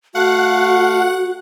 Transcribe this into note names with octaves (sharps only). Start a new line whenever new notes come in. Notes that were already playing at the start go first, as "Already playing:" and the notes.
A3 F#4 F5 F#5